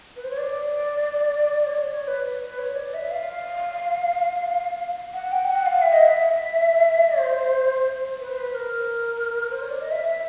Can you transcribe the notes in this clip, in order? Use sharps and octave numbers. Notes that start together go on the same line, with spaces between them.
B4
C5
C#5
D5
C#5
D5
C#5
B4
B4
C#5
D5
E5
F5
F#5
G5
F#5
F5
E5
D#5
E5
C5
B4
C5
B4
A#4
C5
C#5
D5
D#5
E5